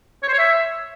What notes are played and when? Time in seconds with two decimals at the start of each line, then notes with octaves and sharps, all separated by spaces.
0.23 C#5
0.28 C5
0.33 C#5
0.39 E5